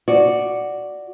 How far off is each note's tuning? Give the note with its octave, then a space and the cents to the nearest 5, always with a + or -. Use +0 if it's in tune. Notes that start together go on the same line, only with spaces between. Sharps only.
F#4 -5 D5 +0